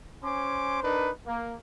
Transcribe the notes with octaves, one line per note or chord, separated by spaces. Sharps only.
C#4 C5 G#5 C6 D6
D4 D#4 A#4 B4
A#3